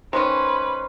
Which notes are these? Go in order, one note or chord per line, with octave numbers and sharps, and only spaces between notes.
D#3 G#3 C#4 B4 C5